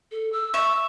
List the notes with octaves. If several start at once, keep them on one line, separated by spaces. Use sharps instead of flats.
A4
E6
E5 C#6